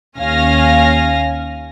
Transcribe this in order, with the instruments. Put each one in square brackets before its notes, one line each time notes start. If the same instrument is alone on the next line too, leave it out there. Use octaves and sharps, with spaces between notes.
[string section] D#2 C#4 F5 G#5 F6 A#6